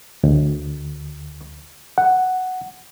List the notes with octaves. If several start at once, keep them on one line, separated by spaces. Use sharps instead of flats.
D2
F#5